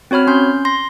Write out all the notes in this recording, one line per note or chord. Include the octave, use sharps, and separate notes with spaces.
C4 F#4 C#5 B5 F6
C#4 C6 G6
C6 A#6